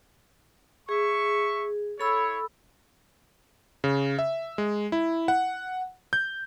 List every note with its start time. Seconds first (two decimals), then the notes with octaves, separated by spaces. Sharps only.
0.89 G#4 E5 C#6
2.00 E4 A4 C#5 B5 E6
3.84 C#3
4.19 E5
4.58 G#3
4.92 E4
5.28 F#5
6.13 G6